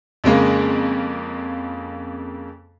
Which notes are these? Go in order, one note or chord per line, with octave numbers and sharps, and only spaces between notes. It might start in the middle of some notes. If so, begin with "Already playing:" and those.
F2 C#3 G#3 A#3